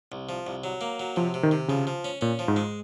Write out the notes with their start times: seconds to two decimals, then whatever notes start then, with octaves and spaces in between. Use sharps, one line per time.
0.12 C2
0.29 F3
0.47 C2
0.64 F#3
0.81 A#3
1.00 F#3
1.16 C3 F3
1.34 C3
1.43 D#3
1.51 C3
1.68 C#3 F3
1.87 F3
2.05 C#4
2.21 A#2 C#4
2.39 F3
2.48 G#2
2.56 G#3